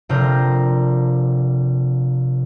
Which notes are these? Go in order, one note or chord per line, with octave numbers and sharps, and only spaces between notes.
F1 C3 D4 A#4 C5